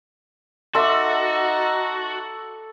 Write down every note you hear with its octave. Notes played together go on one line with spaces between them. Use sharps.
D#4 F#4 A4 E5 C6 D6